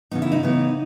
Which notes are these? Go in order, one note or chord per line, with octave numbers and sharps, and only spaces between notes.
C#3 E3 B3 D#4
E4
D#4
C#3 E3 B3